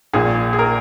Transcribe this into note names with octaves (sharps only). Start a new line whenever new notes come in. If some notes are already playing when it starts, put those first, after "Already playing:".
A#1 A#2 G#4
G#4
A#4